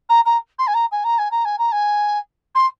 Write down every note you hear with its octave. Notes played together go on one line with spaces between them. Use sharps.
A#5
A#5
C6
G#5
A#5
G#5
A#5
G#5
A#5
G#5
A#5
G#5
C6